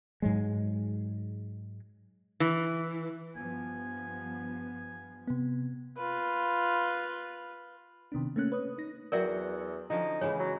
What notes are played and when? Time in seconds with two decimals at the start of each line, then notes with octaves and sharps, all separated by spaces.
0.22 G#2 F#3 G#3
2.40 E3
3.36 G2 F3 B3 G#5
5.28 C3 B3
5.97 F4 B4
8.12 C3 D#3 B3 D4
8.36 A3 A#3 C#4 F#6
8.52 B4 C#5 D#6
8.78 D#4 A#6
9.12 E2 F#3 A#4 D5 E5 F#5 G5
9.90 D3 F3 C#4 D#4
10.21 C#3 E3 G#3 C#5
10.39 F#3